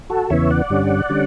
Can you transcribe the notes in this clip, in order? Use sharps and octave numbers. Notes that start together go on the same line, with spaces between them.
F#4 A4
E2 C#3 E3 B3 C#5 E5
D5 F#5
G2 D3 G3 C#4
D3 G3 C#4